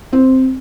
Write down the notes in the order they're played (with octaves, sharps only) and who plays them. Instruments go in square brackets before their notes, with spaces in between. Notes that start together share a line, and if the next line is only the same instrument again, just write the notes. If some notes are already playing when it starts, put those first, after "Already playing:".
[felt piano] C4